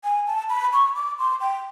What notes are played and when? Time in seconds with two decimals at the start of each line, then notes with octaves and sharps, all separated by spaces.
0.04 G#5
0.27 A5
0.49 B5
0.73 C#6
0.95 D6
1.19 C6
1.41 G5